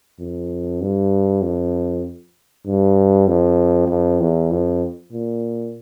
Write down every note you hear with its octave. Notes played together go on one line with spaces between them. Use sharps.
F2
G2
F2
G2
F2
F2
E2
F2
A#2